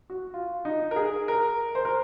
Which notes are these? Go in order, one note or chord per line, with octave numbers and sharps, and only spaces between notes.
F#4
F4
D#4
A#4
G#4
A#4
C5
A#4